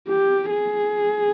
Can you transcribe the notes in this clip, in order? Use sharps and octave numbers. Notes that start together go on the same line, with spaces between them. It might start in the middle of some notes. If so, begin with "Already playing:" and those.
G4
G#4